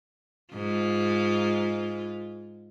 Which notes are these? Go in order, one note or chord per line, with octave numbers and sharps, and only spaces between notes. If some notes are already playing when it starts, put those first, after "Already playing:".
G#2 F4